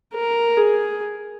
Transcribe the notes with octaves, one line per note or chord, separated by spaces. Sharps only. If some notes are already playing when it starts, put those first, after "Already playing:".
A#4
G#4